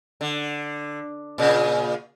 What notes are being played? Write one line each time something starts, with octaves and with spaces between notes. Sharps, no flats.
D3
A#2 C#3